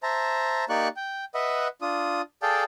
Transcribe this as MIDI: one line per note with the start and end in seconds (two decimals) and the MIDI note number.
0.03 0.65 72
0.03 0.65 76
0.03 0.65 81
0.03 0.65 82
0.69 0.88 58
0.69 0.88 63
0.69 0.88 67
0.69 0.88 74
0.69 0.88 85
0.69 0.88 90
0.96 1.25 79
1.34 1.68 71
1.34 1.68 75
1.34 1.68 76
1.34 1.68 78
1.82 2.22 62
1.82 2.22 65
1.82 2.22 87
2.42 2.64 68
2.42 2.64 69
2.42 2.64 74
2.42 2.64 77
2.42 2.64 79
2.42 2.64 81